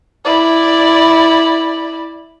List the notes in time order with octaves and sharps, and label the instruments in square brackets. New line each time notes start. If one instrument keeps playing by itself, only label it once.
[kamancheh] E4 D5